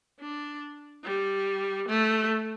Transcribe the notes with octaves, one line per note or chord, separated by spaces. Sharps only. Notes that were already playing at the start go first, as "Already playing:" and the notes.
D4
G3
A3